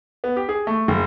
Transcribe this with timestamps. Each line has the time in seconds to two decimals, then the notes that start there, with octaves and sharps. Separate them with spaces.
0.24 B3
0.37 G4
0.49 G#4
0.67 A3
0.88 F#1